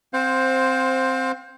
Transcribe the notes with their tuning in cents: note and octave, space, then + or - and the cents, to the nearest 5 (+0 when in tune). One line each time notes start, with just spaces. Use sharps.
C4 +0 C5 +5 F5 +40